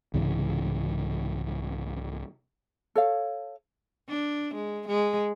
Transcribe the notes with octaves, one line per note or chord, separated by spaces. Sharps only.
C2 G#2 C#3 E3
A4 C#5 F5
D4
G#3
G#3